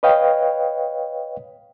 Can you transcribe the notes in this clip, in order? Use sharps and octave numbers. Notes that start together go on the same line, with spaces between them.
B4 C#5 D#5 F5 G5